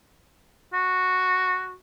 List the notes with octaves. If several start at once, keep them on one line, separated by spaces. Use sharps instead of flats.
F#4